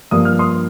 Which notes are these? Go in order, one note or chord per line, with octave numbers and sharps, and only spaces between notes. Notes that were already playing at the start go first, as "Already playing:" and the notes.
G2 F3 A#3 D#6
F6
C6 D#6